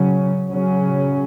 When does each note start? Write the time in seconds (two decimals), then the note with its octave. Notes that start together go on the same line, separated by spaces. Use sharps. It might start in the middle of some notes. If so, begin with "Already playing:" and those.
Already playing: C#3 F#3 C#4
0.48 C#3 F#3 C#4